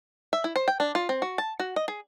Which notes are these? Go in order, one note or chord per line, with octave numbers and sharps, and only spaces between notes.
E5
E4
C5
G5
D4
F4
C4
F#4
A5
F#4
D#5
G#4